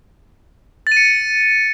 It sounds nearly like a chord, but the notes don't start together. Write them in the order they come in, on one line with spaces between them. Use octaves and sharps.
A6 D#7 C#7